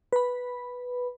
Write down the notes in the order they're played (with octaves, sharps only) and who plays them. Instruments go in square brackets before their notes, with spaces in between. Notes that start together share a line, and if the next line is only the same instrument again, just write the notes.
[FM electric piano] B4 B5